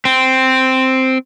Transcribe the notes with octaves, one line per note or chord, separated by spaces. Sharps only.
C4